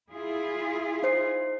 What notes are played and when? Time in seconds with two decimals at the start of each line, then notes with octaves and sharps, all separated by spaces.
0.11 E4 F4 G#4
1.03 D#4 C5 C7